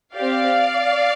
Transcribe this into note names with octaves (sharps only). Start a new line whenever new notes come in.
C4 G4 D5 F5